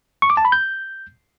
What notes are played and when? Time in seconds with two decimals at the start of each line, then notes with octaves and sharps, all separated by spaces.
0.22 C#6
0.30 D6
0.37 A5
0.45 B5
0.52 G6